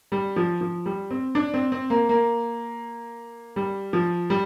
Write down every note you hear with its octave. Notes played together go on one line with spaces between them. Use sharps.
G3
F3
F3
G3
C4
D4
C4
C4
A#3
A#3
G3
F3
G3